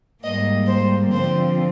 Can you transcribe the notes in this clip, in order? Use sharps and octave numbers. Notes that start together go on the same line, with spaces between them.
G#2 G3 A#3 D#5
C5
D3 F3 C4 C5